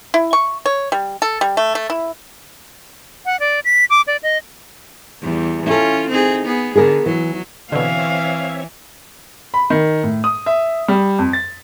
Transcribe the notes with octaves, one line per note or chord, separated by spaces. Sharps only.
E4
C#6
C#5
G3
A4
G3
A3
A3
E4
F#5
D5
B6
D6
D5
D#5
E2 G3
C#4 E4 F4 A4
C4 D#4 G#4
B3 G#4
D3 B3 G#4 A#4
E3 F#3
B2 D3 E3 C4 C#5 E5 F5
B5
D#3
A2
D#6
E5
G3
F2
A6